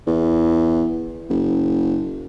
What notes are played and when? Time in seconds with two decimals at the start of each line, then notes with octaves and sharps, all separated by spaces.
0.07 E2
1.29 F#1